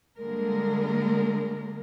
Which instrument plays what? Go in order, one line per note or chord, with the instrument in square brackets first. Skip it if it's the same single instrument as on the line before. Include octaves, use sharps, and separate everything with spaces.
[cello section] D3 G3 G#3 A#3 A#4